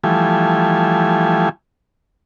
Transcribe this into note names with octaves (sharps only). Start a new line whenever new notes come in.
E3 F3 G3 A3 G#5